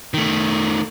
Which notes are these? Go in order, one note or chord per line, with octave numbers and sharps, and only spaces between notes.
D#3 A3